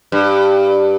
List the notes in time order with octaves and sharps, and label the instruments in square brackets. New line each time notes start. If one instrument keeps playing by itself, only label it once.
[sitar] G2